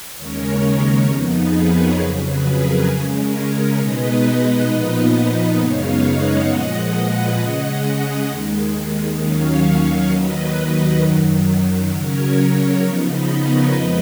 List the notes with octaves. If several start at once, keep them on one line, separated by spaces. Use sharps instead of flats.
D#2 C#3 G#3 C#4 A#4 C#5
A#4 C#5
F2 F3 B3 D#4
G#4 B4
A#4 C#5
F2 C#3 F#3 G#4 B4
G#4 B4
A#4
C#3 G#3 C#4 G#4
A#4
A#4 C#5
B2 G#3 B3 D#4 B4 D#5
A#2 F3 B3 D#4 B4 D#5
F#2 C#3 G#3 B3 D#4 C#5 F5
D#5 F#5
A#2 F3 G#3 D#5 F#5
B4 D#5
C#3 G#3 C#4 D#5 F#5
D#2 D#3 G#3
D#2 D#3 F#3 C#4 C#5 F5
D#2 D#3 F#3 B4 D#5
F#2 D#3 F#3
C#3 F#3 C#4 A#4 C#5
C#3 F3 B3 D#4 A#4 C#5
B4 D#5
A#4 C#5
F2 F3 G#3 B4 D#5